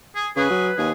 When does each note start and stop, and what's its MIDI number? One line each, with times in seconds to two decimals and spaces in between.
0.15 0.28 68
0.36 0.49 49
0.36 0.67 68
0.36 0.90 71
0.50 0.71 54
0.78 0.92 39
0.78 0.91 68